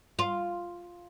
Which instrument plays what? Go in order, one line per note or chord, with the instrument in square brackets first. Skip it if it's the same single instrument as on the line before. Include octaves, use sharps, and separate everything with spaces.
[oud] F4